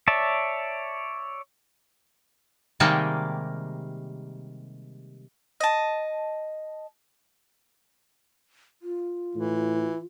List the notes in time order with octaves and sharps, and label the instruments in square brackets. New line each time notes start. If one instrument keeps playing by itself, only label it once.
[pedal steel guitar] C#5 D5 E5 A5
[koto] C3 D#3 G3 G#3 A#3
[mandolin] D#5 A5
[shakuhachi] F4
[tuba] A2 [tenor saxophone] E3